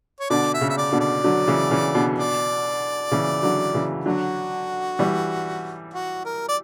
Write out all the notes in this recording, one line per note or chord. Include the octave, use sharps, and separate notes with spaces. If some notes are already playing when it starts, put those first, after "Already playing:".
C#5
B2 D3 D5
E5
C#3
E5
D5
B2 D3
D5
D3 F#3
C#3 E3
C#3 E3
B2 D3
D5
C#3 E3
D3 F#3
C#3 E3
D3 F#3 F#4
E3 G3
F#4
A#4
D5